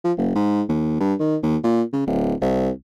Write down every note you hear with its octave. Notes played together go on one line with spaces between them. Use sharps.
F3
F#1
G#2
D#2
G2
D#3
D#2
A#2
C#3
D1
C2